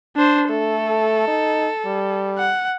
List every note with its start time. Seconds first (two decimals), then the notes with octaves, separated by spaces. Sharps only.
0.17 D4 C5
0.50 A3 A4
1.27 D#4
1.86 G3
2.38 F#5